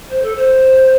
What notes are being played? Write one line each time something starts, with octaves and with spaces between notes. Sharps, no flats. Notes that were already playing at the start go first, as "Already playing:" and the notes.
C5
A4
C5